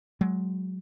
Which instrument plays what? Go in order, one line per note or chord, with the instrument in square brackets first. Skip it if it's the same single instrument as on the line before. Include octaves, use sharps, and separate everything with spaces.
[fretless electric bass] F#3 G#3